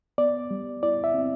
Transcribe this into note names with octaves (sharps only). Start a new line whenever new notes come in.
B3 D5
G3
E4 D5
E5
C4